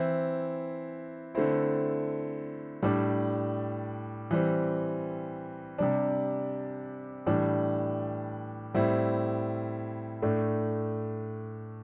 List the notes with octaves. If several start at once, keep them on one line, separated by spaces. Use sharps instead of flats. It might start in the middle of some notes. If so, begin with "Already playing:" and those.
Already playing: E3 C4 E4
D3 A3 C4 E4
A2 G3 D4
E3 G3 C4
C3 G3 D4
A2 E3 G3 D4
A2 G3 C4 E4
A2 A3 D4